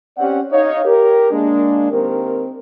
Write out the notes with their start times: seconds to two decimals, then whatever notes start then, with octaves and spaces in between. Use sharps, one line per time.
0.18 C4 C#4 G4 D5 F#5
0.51 D#4 C#5 D#5 F5
0.85 G4 A#4
1.31 G#3 A#3 D4
1.91 D#3 A#3 C4 G4 A#4